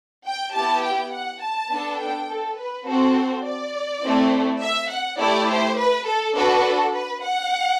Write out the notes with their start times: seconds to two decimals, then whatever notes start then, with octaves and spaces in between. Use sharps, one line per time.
0.25 G5
0.53 B3 E4 G4 A5
0.83 G5
1.12 F#5
1.41 A5
1.70 B3 D4 A4
1.99 G5
2.29 A4
2.57 B4
2.87 C4 F#4 A4 C5
3.45 D5
4.03 A3 C4 E4
4.62 E5
4.90 F#5
5.19 A3 E4 G4 D5
5.49 C5
5.78 B4
6.07 A4
6.36 D4 F#4 A4 B4
6.65 A4
6.94 B4
7.23 F#5